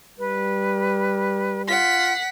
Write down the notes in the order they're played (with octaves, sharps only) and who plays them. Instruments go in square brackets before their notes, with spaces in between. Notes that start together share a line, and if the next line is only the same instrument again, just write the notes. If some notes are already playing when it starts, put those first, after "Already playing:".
[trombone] G3 [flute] B4
[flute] F4 [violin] F#5 B6